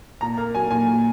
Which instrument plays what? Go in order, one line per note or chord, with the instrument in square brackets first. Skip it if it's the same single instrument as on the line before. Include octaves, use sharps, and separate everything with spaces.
[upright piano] A#2 A#5
A#3
F#3 G#5
A#2 G#5
A#2